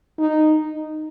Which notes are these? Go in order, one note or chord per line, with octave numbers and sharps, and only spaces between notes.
D#4